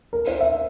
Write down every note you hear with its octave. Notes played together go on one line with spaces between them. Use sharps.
A#4
C5
E5